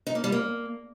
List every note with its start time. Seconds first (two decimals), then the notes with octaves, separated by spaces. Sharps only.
0.07 D#4
0.15 A#3
0.24 G3
0.32 A#3